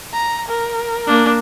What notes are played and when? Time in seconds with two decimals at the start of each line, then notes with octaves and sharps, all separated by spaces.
0.13 A#5
0.48 A#4
1.07 A#3 D4